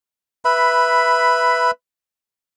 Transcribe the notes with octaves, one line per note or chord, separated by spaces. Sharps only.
B4 E5 B5